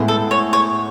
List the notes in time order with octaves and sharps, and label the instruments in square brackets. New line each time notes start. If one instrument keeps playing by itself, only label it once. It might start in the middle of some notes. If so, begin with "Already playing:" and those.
Already playing: [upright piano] A2 G#3 B3 E4 G#4
[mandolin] A4
C#5
C#5